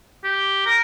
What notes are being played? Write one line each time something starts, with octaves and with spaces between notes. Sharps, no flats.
G4
A#4